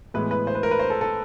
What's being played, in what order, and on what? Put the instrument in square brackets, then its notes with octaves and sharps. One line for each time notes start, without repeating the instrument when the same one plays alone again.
[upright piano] A2 E3 G#3 B3 B4
B4
C5
B4
A#4
B4
C5
A4
A4